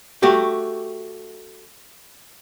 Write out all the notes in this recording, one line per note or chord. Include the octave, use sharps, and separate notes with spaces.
A3 F#4 G4